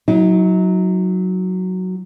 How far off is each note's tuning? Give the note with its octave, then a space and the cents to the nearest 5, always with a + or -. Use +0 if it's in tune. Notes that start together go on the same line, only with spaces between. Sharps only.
F#3 +0 D#4 +45